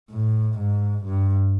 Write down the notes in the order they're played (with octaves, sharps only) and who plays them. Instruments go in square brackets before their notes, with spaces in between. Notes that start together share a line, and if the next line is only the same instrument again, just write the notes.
[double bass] A2
G#2
G2